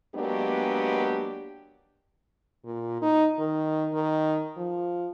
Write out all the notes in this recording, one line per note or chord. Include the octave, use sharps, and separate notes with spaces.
F#3 G#3 A#3 B3 D4 G4
A#2
D#4
D#3
D#3
F3